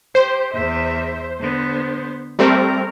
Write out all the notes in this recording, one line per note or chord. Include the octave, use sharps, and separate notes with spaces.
G4 C5
E2 E5
D3 B3
G3 A3 C4 A#4